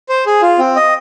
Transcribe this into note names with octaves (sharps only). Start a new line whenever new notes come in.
C5
G#4
F4
C4
D#5